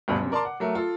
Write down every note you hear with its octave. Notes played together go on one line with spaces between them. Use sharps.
G1 D2 G2 B2
F#2 C3
A#4 D5 A5 A#5 C6 D6
F#5
F#3 A3 A#4
F4 A4